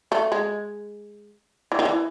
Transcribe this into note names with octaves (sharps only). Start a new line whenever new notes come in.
A3
G#3
E3
D#3
E3